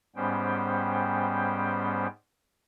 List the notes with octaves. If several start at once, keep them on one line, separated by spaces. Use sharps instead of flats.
G#2 G3 B3 C#4 C5 G5